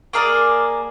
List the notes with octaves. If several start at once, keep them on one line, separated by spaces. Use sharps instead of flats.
A#3 G#4 A#4 D5